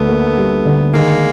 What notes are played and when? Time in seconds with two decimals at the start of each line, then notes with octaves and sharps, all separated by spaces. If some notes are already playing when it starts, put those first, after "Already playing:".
Already playing: D2 D3 A3 B3
0.09 A#3
0.37 G3
0.65 D3
0.94 D#3 G#3 A#3